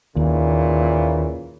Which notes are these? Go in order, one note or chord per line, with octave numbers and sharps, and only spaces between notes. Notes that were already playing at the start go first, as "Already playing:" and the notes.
D#2 A#2 C#3 E3